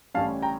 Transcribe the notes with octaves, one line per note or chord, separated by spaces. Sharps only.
A1 A2 G3 C#4 F5 A5
G5 A#5